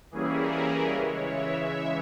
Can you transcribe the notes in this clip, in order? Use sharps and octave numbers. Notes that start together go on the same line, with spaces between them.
E3 G3 A#3 C#4 E4 G#4
A#4
C#3 E3 G#3 E4 C#5
E5